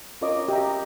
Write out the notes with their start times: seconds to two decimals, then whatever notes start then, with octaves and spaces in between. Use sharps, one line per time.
0.21 C#4 F4 A#4 C#5 D#5 D6
0.48 G4 D#5 E5 A#5